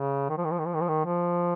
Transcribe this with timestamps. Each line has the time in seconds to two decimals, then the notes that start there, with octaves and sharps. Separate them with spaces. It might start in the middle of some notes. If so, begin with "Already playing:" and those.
Already playing: C#3
0.29 D#3
0.37 F3
0.44 D#3
0.51 F3
0.59 D#3
0.66 F3
0.74 D#3
0.81 F3
0.89 D#3
1.05 F3